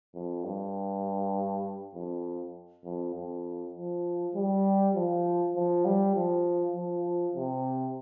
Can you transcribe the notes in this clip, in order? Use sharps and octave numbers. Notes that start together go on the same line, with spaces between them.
F2
G2
F2
F2
F2
F3
G3
F3
F3
G3
F3
F3
C3